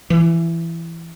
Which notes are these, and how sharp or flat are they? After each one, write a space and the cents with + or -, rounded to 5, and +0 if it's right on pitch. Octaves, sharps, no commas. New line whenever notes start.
E3 +15